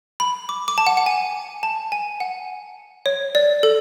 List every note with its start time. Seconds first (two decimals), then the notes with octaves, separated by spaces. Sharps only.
0.20 B5
0.49 D6
0.68 D6
0.78 A5
0.87 F#5
0.97 F#5
1.06 G#5
1.63 A5
1.92 G#5
2.20 F#5
3.06 C#5
3.35 D5
3.63 A4